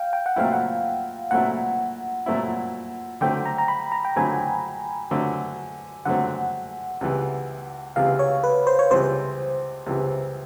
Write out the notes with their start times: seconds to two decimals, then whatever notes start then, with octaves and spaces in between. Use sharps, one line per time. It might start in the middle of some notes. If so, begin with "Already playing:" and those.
Already playing: F5 G5
0.13 G5
0.26 F#5
0.36 A#2 F#3 A3 C4 E4 F5
0.53 F#5
1.31 A#2 F#3 A3 C4 E4 F#5
2.26 A#2 F#3 A3 C4 E4
3.21 D3 F#3 A3 C4 G5
3.46 A#5
3.58 A#5
3.68 B5
3.92 A#5
4.05 G5
4.16 D3 F#3 A3 C4 G#5
5.11 D3 F#3 A3 C4
6.05 D3 F#3 A3 C4 F#5
7.01 C#2 C3 E3
7.96 C#2 C3 E3 F5
8.19 C#5
8.44 B4
8.67 C5
8.79 C#5
8.91 C#2 C3 E3 C5
9.86 C#2 C3 E3